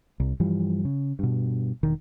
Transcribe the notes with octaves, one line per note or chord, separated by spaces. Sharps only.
C2
G2 E3 F3 G3
C#3
G2 B2
E1 D#3